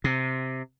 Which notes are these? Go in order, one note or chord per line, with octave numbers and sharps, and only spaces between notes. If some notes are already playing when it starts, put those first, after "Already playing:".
C3